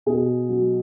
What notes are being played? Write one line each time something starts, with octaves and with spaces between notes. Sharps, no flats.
B2 G#4
F#3